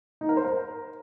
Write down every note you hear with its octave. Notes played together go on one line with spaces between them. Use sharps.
D#4
A#4
C5
A#4